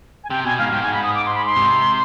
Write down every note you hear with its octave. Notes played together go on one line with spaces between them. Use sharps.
G#5
C3 G5
B2 G#5
G#2 F5
G#2 G5
G#5
B5
D#6
D6
C6
B5
C6
C3